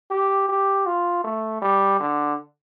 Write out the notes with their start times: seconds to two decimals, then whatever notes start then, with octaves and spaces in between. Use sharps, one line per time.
0.11 G4
0.49 G4
0.86 F4
1.24 A3
1.62 G3
2.00 D3